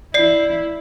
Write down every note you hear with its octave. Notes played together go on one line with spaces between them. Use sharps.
E4 D5 C7